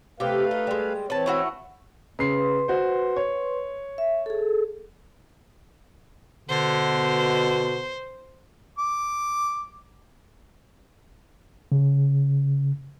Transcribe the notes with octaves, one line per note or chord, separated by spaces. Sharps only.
C3 A3 G4 B4 F5
D#4
G3 G#3
E3 C4 B4 C#5 A5
A3 E4 F#4
C#3 B4 C6 C7
F#4 C5
C#5
E5
G#4 A4
B2 D3 C5
D6
C#3